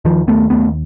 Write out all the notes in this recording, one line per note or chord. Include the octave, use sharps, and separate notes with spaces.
D#2 D#3 F3
D#2 A3 B3
D#2 A3 B3